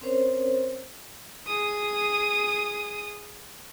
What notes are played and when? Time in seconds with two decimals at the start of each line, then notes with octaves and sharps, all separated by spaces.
0.01 C4 C#4 A#4 C5 C#5
1.47 G#4 D#6